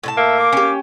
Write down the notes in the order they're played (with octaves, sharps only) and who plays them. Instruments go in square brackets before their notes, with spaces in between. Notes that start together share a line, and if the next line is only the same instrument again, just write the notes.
[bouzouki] A2 E4 A5
[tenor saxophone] A#3 [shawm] E5
[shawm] D6
[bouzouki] C#4 G4